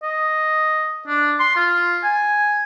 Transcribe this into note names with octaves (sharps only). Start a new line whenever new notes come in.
D#5
D4
C6
F4
G#5